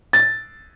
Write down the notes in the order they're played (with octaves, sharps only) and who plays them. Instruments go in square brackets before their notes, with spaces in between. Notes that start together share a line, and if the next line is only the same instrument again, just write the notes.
[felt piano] A6